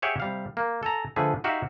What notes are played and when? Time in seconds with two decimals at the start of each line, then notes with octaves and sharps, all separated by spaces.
0.02 G4 G#4 C#5 E5 F#5 G5
0.20 C3 G3 F5
0.57 A#3
0.83 A4 G#5 A#5
1.16 D3 F3 A3 G#4 B4
1.44 D#4 F#4 G4 E5 F5